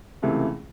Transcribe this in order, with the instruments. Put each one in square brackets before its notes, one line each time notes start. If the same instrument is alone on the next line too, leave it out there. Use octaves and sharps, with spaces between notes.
[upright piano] C#2 C3 E3 A3